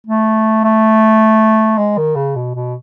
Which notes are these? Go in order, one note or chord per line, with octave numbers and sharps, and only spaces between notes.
A3
A3
G#3
D#3
C#3
B2
B2